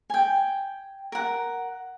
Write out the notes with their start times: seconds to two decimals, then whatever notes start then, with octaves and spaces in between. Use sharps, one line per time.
0.10 G5 G#5
1.12 A#4 F#5